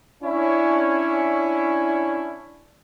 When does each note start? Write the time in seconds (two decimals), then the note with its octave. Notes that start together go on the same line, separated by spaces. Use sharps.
0.23 C#4 D4 E4